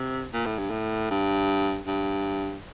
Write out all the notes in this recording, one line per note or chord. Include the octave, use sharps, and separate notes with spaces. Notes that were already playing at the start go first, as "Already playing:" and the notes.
Already playing: C3
A#2
A2
G2
A2
G2
G2